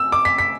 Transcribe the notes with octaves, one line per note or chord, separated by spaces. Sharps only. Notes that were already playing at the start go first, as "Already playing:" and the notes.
Already playing: E6
D6
B6
B6